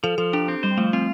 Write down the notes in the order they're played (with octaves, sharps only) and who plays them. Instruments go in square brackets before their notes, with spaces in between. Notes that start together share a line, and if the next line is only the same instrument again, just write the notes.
[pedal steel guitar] F3 [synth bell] A4
[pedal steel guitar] F3 [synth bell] A4
[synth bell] D4 [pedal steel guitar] G4
[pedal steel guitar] C4
[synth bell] G3 [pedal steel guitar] C5
[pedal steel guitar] F3 [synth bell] A3
[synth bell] C4 [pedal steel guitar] F4